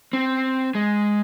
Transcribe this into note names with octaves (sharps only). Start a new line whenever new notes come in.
C4
G#3